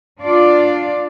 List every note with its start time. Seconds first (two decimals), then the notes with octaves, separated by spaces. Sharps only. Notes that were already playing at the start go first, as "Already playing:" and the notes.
0.21 D4 F4 D5